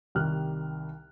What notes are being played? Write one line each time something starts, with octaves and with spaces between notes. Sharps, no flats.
C2 D#3 G3 G4 F6 F#6